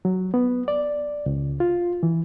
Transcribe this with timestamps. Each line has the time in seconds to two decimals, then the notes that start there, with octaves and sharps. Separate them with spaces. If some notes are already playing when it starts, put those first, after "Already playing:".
0.05 F#3
0.34 B3
0.68 D5
1.26 C#2
1.60 F4
2.03 E3